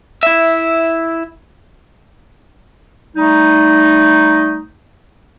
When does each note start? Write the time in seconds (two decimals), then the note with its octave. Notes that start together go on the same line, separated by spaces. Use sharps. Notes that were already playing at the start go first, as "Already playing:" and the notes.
0.23 E4 E5
3.16 G3 A3 D#4